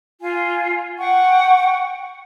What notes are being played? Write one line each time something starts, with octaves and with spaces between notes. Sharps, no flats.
F4 G#5
F#5 G5 C#6